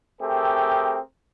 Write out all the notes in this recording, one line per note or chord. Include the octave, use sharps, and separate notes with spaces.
A3 C4 G4 G#4 A#4